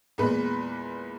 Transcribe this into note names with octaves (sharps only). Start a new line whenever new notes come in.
E2 A#2 G#3 B4